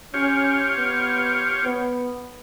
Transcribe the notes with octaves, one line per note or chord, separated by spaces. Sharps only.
C#4 F4 G4 C#5
B3
B3